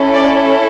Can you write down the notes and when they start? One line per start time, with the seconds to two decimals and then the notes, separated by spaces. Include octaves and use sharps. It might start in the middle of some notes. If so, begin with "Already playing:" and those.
Already playing: C#4 E4 A4
0.13 D5